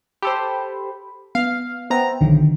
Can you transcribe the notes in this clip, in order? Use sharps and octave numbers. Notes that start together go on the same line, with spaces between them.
G4 A4 C5 B5
B3 F5
B3 C5 E5 G5 A#5
B1 D3 D#3